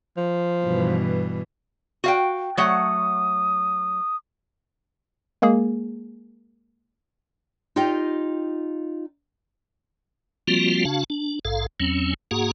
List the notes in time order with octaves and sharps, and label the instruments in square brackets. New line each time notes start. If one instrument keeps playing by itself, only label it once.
[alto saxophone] F3
[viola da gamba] G2 B2 E3
[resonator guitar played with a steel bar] F#4 F5 G5
[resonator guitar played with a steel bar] F#3 A3 F#5 [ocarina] D#6
[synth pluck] G#3 A#3 G#4
[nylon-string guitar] D#4 F4 G4 D#5 G5
[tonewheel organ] F3 G3 A#3 C4 F4 F#4
C#3 D4 F#4 F5 A5
D4
A#1 G#2 A4 F5
E2 F#3 C4 C#4
G#2 A#3 F#4 G#4 F#5 A#5